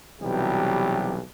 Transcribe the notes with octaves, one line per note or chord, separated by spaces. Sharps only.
B1 C3 E3 F#3 G3 G4